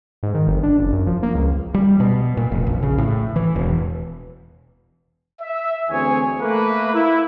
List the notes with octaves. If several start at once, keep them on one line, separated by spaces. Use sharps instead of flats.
G#2
D#3
G1
D4
F#1
F#2
F3
A#3
C#2
G3
B2
A#2
F1
A#1
C#3
A2
E3
E1
E5
D2 E3 C4 G#4 C#5 G#5
A3 A#3 B4
E4